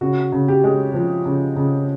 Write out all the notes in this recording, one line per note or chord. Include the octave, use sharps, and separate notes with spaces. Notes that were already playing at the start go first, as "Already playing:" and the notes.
C#3 F#4
C#3
G4
G#3
F3
C#3
C#3